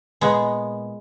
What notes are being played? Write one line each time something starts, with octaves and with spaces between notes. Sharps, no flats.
A#2 G#3 B3